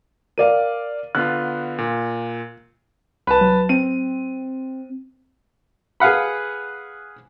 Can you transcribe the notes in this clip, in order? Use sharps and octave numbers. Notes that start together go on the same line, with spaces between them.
A#4 D5 F5 D#7
D3 B3 F4 F#6
A#2
C2 B4 A5
F#3
C4 D#7
G#4 B4 F5 F#5 B5